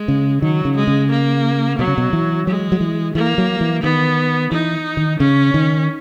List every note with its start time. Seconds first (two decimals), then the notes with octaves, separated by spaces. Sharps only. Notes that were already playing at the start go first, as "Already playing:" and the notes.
Already playing: G#3
0.08 C#3
0.42 D#3 F#3
0.65 C#3
0.76 G#3
0.87 C#3
1.11 A#3
1.78 B2 F#3
1.88 C#3
1.98 B2
2.13 E3
2.47 F#3 G#3
2.72 F#3
2.81 E3
3.15 E3 A#3
3.38 F#3
3.61 E3
3.83 D#3 B3
4.52 E3 D#4
4.97 D#3
5.20 C#3 C#4
5.54 D#3